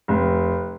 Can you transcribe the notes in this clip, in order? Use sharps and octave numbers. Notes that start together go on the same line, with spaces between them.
F1